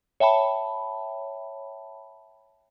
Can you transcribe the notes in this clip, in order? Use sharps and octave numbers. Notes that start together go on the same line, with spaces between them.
C#5 E5 G5 A5 B5